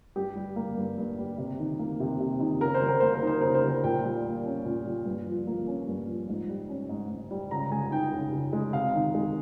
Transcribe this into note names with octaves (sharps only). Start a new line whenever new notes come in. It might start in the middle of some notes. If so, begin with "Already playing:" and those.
G2 G4
G3
A#3
G2
G2
G3
C3
D#3
A#3
C3
C3
D#3
C#3 A#4
C5
G3
A#4
A#3 C5
A#4
D#4 C5
C#3 A#4
C5
G3 A#4
A#2 G5
G3
A#3
C#4
A#2
G3
G2
F3
A#3
C#4
G2
F3
G#2
G3
C#4
G#2
G#2
G3
C#3 A#5
G#3 G#5
D#4 G5
C#3
C#3
G#3
C3 F5
D#3
G#3